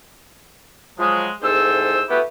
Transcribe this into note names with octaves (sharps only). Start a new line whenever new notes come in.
F3 F#3 G#3
C2 G#2 G#4 A4 C5 E6
A3 B3 E4 F#4 G4 B4